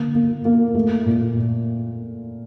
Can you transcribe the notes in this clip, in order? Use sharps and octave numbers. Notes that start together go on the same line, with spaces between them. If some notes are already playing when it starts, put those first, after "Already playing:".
Already playing: D3 A#3
A#3
A#3
A3
A#2